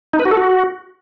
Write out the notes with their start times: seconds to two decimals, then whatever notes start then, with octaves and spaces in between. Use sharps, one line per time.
0.13 D#4
0.19 B4
0.25 F#4
0.31 A4
0.37 F#4